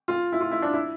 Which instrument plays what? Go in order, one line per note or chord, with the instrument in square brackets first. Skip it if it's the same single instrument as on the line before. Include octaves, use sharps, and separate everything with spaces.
[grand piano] F4
E4
F4
E4
D4
E4